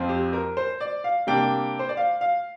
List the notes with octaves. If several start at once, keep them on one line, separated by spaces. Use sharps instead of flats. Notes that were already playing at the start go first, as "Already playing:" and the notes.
Already playing: F2 F3 C4
G4
A#4
C5
D5
F5
C3 G3 A#3 D4 G5
C5
D5
F5
F5